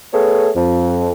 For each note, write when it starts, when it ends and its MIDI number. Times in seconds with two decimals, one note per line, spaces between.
0.12 0.49 57
0.12 0.49 59
0.12 0.49 68
0.12 0.49 69
0.12 0.49 73
0.56 1.12 41